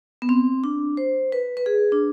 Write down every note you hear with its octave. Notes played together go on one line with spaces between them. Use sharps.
B3
C4
D4
C5
B4
B4
G#4
D4